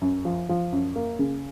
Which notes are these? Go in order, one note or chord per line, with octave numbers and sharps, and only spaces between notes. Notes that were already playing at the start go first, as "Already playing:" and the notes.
F#2
F3
F3
F#2
A#3
C#3